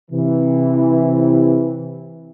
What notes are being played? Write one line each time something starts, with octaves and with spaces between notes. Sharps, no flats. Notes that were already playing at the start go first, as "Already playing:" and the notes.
C3 E3